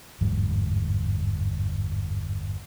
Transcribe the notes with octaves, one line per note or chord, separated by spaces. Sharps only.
G1 E2 G#2 F#3